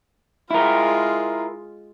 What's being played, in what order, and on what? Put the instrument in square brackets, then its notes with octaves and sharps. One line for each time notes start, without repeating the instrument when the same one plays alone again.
[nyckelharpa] G#3 F4 [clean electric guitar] E4 A#4